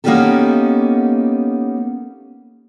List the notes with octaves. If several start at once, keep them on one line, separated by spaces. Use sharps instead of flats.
A#3 B3 C#4 D#4 G4 A4